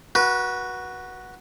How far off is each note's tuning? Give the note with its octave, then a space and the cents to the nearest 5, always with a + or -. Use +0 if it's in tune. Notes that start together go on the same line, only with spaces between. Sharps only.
F#4 +0 B4 -30